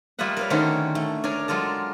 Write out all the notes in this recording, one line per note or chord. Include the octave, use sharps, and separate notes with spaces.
G3 A#3 F4 D#5 E5 F#5
A#4 B4 C#5
D3 D#3 A3 C#4 F#4 C5
A3
D4 A#4 C#5 G#5
F#3 G#3 F4 A4 A#4